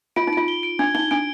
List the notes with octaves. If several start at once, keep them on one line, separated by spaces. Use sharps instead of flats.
F4 D7
D#4
F4 D7
G7
D7
D4 G#6
D#4 G7
D4 D7